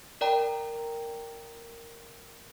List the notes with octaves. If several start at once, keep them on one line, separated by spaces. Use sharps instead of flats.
A#4 D5 G5 A#5